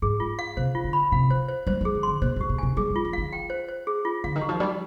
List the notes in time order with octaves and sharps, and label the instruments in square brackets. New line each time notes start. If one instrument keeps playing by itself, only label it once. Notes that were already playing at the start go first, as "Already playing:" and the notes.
[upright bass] G#2 [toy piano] G#4
[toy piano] F4
F5
[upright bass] C3 [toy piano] C5
[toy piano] F4
[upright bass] D3
[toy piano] B5
[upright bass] C3 [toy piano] F5
[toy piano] C5
C5
[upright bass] G3 [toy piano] C5
[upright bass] F3
[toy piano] G#4
[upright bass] D#3
[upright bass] D3 [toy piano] C6
[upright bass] B2 [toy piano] C5
[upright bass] G2
[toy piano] G4
[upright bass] B2
[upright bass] C3 [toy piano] G#5
[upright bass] G3 [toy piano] G#4
[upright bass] G3
[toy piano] F4
[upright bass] F3
[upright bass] D#3 [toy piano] F5
[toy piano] G5
C5
C5
G#4
F4
[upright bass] D3 [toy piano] F5
[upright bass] D#3
[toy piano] G4
[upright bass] F3
[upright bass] G3 [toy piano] D#4